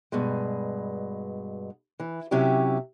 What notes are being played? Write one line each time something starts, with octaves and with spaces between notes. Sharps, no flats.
G2 B2 G#3
E3
C3 F#3 C#4 E4 G4